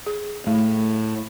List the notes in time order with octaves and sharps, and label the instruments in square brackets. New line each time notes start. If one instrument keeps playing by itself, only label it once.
[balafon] G#4
[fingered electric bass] A2 [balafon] A3